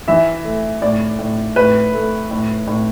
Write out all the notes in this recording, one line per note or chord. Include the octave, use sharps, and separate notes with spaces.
E3 E5
A3
A2 D5
A2
A2 B4
A3
A2
A2